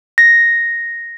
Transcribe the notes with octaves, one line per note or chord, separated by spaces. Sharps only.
A#6